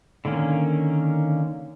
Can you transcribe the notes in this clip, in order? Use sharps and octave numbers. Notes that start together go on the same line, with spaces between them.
D3 D#3 A#3 C#4